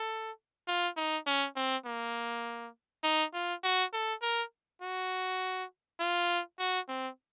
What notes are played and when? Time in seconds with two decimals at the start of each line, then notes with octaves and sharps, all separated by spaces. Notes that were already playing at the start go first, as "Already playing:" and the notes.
Already playing: A4
0.68 F4
0.97 D#4
1.27 C#4
1.56 C4
1.86 A#3
3.04 D#4
3.33 F4
3.64 F#4
3.93 A4
4.22 A#4
4.82 F#4
6.00 F4
6.59 F#4
6.88 C4